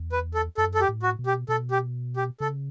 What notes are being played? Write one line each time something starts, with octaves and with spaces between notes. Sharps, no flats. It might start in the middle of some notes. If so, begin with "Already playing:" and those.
Already playing: E2
B4
A4
F#2 A4
A4
G4
A2
F#4
B2
G4
B2 A4
G4
G4
C#3 A4